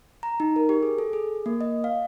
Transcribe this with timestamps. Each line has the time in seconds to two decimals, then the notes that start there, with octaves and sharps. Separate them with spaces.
0.23 A#5
0.40 D#4
0.56 A#4
0.69 G4
0.83 G#4
0.98 A4
1.13 G#4
1.46 A#3
1.61 D#5
1.84 F5